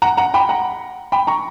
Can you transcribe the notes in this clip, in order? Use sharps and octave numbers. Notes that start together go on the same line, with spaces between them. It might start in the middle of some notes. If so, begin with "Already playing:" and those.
F#5 A#5
F#5 A#5
G5 B5
F#5 A#5
G5 B5
A#5 C#6